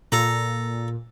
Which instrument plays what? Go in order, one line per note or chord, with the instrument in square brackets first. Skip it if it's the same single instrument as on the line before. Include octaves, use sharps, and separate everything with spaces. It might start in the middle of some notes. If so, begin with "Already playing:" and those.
[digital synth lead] A#2 [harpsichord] A4 A#5